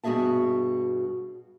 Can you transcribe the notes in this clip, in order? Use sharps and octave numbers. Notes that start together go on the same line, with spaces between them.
G2 B2 F#4 G#4 E5 A5